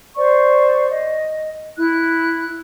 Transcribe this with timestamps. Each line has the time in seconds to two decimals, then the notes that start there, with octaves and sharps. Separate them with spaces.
0.16 C5 D5 C#6
0.88 D#5
1.76 E4 F#6